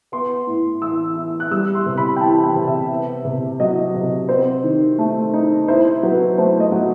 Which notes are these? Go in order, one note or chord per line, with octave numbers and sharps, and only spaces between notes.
B3 C6
A2
E3 E6
E4
F#6
G3 E6
C6
C3
B5
G5
E3 A5
G5
C3
E5
B3
C3
F#3 D#5
C3
C4 C5
D#3
A3
D#4
E4 C5
F#3 B4
A3 C5
D#5
F#3